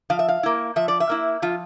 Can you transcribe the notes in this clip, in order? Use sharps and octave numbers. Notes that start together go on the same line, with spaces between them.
F3 F5
E5
F5
A#3 E4
F3 E5
D5
E5
A#3 E4
F3 F4